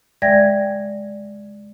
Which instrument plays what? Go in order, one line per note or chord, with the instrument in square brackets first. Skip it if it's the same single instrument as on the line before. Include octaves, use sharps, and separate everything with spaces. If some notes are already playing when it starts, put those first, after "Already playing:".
[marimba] G#3 D5 E5 G5 G#6 A#6